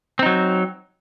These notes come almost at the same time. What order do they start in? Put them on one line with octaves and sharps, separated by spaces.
C4 D#4 F#3